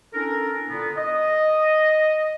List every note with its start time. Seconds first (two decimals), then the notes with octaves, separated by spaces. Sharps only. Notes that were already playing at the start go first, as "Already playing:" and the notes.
0.14 C#4 D4 E4 A4 A#4
0.69 A#2 D3 B3
0.98 D#5